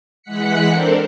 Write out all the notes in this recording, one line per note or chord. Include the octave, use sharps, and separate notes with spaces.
E3 G#3 F#5 F#6 B6 C#7
C4 D4 A4 A#4 C5